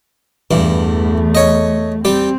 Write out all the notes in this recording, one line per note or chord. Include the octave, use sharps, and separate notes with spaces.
E2 G2 E3 A3
C#5 D#5
G3 C4 G4